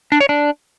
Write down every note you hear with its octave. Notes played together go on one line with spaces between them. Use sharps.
D4
C#5
D4